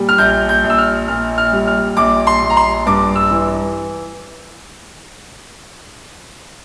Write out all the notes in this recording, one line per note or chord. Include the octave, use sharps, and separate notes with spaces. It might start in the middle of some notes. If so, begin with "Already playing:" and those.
Already playing: A#2 G3
F6
A#1 G6
G6
A#1
E6
F6
A#2 F6
F6
G3
F6
A#1 D6
C6
A#1
A#5
C6
G2 D6
E6
E3